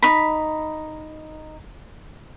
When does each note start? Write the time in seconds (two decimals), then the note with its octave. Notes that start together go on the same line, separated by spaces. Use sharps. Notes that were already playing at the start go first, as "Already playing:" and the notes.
0.02 D#4 B5